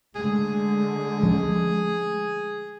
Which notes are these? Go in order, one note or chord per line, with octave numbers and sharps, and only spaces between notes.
D3 G#3 A3 G#4
F3 C#4